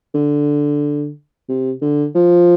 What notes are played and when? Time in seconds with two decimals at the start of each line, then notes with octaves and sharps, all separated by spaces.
0.15 D3
1.49 C3
1.82 D3
2.15 F3